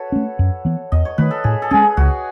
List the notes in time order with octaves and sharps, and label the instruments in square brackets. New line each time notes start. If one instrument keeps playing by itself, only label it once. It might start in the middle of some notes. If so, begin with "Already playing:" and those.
Already playing: [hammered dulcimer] F#4 A4 B4 C#5
[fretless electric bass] A3 C#4
F#2
E3 B3
[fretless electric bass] E2 [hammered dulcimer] D#5
[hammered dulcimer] C#5
[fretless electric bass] D#3 A3 [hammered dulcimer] B4
[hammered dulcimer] A4
[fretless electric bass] A2 [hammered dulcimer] G#4
[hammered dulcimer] A4
[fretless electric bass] G#3 C#4 [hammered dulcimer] G#4
[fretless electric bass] C#2 [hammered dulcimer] F#4